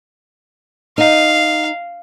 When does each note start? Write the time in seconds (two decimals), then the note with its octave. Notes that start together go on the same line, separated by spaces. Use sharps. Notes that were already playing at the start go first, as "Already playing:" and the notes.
0.98 D#4 F5